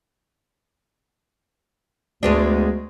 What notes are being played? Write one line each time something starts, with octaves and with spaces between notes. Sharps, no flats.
D2 G#3 B3 D4